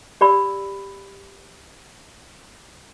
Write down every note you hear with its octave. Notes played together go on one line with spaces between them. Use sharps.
G4 D5 B5 E6